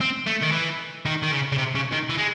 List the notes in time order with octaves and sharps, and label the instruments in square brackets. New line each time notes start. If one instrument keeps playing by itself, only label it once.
[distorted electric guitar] C4
A3
D#3
E3
D#3
D#3
C#3
C#3
C3
C#3
D#3
E3
G#3